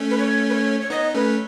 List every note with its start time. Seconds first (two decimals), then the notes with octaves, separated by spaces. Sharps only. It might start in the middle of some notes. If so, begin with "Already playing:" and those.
Already playing: A3 C#4
0.11 B4
0.18 C#5
0.49 B4
0.54 C#5
0.81 C#5
0.90 B3 D#4 D#5
1.14 A3 C#4 B4